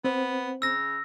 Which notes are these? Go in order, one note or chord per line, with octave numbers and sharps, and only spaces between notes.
B3 C4 C5
C#3 E6 A#6